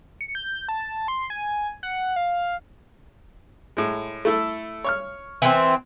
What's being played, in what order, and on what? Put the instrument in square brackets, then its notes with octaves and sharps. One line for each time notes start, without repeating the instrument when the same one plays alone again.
[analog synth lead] C#7
G6
A5
C6
G#5
F#5
F5
[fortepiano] A2 G#3
A3 E4 A4
C#5 C#6 F6
[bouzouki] E3 A#3 C4